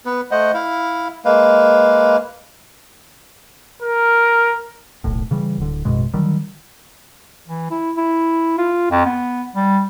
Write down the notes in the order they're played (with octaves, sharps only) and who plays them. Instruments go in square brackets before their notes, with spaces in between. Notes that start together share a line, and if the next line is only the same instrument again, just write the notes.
[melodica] B3 B4
A3 C5 D#5 F#5
E4 F5
G#3 A#3 B4 F5
[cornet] A#4
[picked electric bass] D#1 B1 A2
C#3 E3 G3
D1 D3
A1 F#2 B2 G#3
D3 D#3 F#3 G3
[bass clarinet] E3
E4
E4
F4
F2
B3
G3